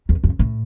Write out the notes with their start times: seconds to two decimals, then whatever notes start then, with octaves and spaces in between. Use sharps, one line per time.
0.09 E2
0.24 F2
0.39 A2